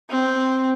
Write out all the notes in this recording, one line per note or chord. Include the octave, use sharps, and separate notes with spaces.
C4